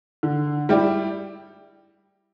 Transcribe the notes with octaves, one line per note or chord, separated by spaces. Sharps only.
D3
G3 E4 G4